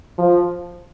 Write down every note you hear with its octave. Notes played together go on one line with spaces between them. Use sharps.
F3